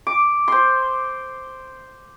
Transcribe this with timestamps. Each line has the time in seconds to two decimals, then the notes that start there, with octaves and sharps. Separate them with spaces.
0.07 D6
0.48 C5 C6